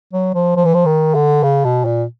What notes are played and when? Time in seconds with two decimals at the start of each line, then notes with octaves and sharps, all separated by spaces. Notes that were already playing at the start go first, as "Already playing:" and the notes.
0.13 F#3
0.35 F3
0.56 F3
0.65 E3
0.74 F3
0.86 D#3
1.15 D3
1.43 C#3
1.65 B2
1.86 A#2